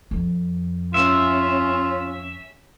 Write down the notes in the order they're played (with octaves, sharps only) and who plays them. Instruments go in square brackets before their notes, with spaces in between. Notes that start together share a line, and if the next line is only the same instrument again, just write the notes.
[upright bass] F2
[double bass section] C#4 [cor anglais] F4 [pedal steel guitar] E5